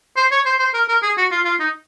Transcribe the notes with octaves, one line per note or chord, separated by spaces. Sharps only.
C5
C#5
C5
C5
A#4
A#4
G#4
F#4
F4
F4
D#4